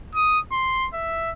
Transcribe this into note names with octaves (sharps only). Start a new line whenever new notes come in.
D#6
C6
E5